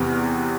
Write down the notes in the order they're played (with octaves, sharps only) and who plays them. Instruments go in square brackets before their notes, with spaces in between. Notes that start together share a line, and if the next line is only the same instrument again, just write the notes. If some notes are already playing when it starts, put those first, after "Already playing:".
Already playing: [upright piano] E2 C3 E3 B3 F6